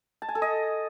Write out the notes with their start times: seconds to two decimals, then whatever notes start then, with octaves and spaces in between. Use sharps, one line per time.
0.22 A5
0.29 G#5
0.35 A4
0.42 D#5